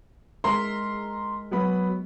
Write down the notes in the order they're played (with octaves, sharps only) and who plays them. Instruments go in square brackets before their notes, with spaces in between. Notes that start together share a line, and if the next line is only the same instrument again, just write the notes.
[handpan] G#3 A#4 E5 [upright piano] A#5 C6
[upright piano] F#3 B3 B5